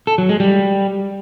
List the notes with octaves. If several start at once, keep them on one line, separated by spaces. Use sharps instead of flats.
A4
F#3
G#3
G3